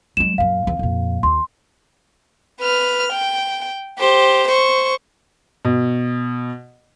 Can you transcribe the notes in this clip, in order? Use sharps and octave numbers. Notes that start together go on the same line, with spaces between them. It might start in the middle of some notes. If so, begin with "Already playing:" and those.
F#3 G#3 E7
F#2 A#2 F5
F#1 E2
F2 A#2
D#2 C6
B4 F6
G5
G4 C5
C5 C#6
B2